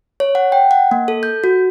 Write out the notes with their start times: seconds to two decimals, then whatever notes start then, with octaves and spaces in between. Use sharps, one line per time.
0.20 C#5
0.35 F#5
0.52 G5
0.71 F#5
0.91 A#3
1.08 A4
1.23 G6
1.44 F#4